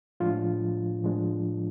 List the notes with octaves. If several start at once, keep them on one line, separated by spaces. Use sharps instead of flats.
A2 F3 G#3 D4 F4
A2 F3 G#3 D4